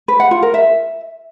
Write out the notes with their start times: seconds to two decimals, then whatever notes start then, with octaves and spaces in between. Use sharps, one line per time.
0.08 B4
0.20 F#5
0.31 F4
0.42 A#4
0.54 E5